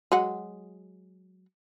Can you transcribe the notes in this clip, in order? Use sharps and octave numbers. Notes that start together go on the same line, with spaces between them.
F#3 G#3 F#5